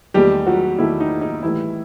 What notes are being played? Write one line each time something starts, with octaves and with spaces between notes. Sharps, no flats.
E2 D#3 G3 A3 G4
F#3 F#4
E2 D#3 A3 E4
D#4
D#4
A2 E3 G3 E4